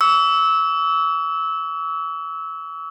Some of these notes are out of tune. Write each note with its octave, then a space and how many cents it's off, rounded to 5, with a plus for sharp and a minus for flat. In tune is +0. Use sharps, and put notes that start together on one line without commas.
C#6 +45 E6 -20